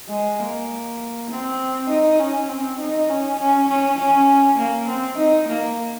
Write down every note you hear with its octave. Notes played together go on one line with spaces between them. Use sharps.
G#3
A#3
C4
D#4
C#4
C4
D#4
C#4
C#4
C#4
C#4
A#3
C4
D#4
A#3